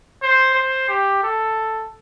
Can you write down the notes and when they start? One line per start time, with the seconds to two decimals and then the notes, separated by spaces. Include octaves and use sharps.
0.22 C5
0.55 C5
0.89 G4
1.23 A4